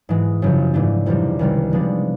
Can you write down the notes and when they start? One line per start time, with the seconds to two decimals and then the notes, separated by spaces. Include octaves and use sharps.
0.09 G#2 E3 G#3
0.42 F#2 C#3 F3
0.74 G#2 E3 A3 D4
1.06 F2 C3 E3 G3
1.39 C#2 C3 D#3 G3
1.71 C3 F3 G#3 B3 D4